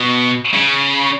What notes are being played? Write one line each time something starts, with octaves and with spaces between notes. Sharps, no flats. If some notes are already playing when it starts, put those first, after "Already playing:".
Already playing: B2
C#3